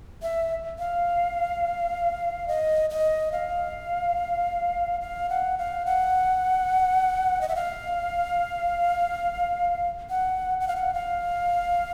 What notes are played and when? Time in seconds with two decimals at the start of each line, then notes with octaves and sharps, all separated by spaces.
0.23 E5
0.79 F5
2.48 D#5
2.90 D#5
3.32 F5
5.01 F5
5.29 F#5
5.58 F5
5.86 F#5
7.41 D#5
7.48 E5
7.55 F5
10.10 F#5
10.60 F#5
10.68 F5
10.76 F#5
10.94 F5